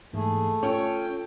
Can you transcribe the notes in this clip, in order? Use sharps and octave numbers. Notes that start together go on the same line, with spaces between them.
G#2 E3 A3 A#3 G#4
C#4 F4 A4 C#5 G5